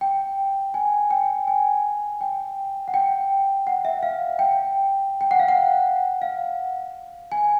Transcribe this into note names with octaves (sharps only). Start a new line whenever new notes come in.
G5
G#5
G5
G#5
G5
F#5
G5
F#5
E5
F5
G5
G5
F#5
F5
F#5
F5
G#5